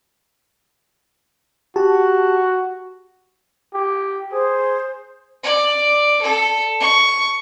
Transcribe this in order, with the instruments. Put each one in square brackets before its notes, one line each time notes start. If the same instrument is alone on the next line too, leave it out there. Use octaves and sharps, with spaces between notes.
[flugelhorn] F#4 [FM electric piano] G4 A5
[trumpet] G4
[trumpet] G#4 [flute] C5
[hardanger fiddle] D5
A4
C#6